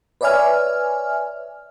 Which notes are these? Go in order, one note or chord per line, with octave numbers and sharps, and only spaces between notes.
B4 C#5 D5 E5 G#5 F6